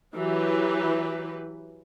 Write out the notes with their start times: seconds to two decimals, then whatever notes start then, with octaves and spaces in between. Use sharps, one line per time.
0.13 E3 F#3 G4 B4